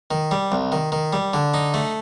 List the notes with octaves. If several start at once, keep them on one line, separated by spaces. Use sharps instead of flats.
D#3
G3
C2
D#3
D#3
G3
D3
D#4
A3